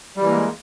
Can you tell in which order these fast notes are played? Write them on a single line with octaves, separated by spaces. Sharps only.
G3 E3 A#3 G#3